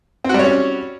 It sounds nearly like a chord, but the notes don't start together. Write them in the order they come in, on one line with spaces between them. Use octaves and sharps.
C4 F#4 G3 C#5 C#4